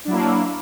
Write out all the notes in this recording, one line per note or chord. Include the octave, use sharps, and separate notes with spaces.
F#3 A#3 D4 E4